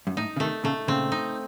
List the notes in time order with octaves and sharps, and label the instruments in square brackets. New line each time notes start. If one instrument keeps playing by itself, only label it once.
[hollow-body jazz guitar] F#2
[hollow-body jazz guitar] A2 [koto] D#4
[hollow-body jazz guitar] C#3
[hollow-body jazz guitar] C3 D#3 [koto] A3
[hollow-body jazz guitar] A#2 C#3 [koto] A3
[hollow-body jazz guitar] A#2 C#3 [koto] C4
[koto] D#4